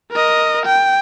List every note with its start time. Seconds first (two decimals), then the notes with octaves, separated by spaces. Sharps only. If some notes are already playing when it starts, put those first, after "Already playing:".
0.11 A#4 D#5
0.66 G5